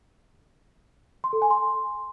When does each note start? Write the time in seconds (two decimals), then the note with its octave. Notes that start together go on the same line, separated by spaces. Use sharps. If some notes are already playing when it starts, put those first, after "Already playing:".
1.24 C6
1.33 A4
1.42 G#5
1.51 C6